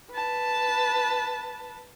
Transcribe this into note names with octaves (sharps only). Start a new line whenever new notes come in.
B4 A5